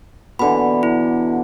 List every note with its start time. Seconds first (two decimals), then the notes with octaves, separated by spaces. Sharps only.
0.39 B2 D3 E3 B5
0.83 E4